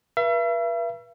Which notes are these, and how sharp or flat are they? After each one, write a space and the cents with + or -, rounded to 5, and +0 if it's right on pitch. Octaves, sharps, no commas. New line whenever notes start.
B4 -40 E5 +40